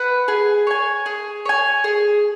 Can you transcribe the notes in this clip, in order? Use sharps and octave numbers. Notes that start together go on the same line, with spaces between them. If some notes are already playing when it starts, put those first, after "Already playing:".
Already playing: B4 F#5
G#4
C#5 G#5
G#4
C#5 G#5
G#4